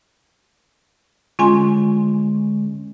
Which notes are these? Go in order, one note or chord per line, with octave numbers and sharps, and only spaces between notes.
D3 G#3 C#4 F4 G#5 C6